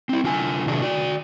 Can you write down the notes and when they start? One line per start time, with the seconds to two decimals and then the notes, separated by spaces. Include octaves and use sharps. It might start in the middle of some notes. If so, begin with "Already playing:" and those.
0.09 C4 E4
0.24 D3 F4 G#5
0.66 C3 D#3 F#3 D4 D#4 G#4
0.82 F#4 D5